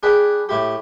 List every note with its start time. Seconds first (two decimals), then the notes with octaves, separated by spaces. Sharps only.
0.03 D4 G#4 B4 G5
0.49 A2 E4 G4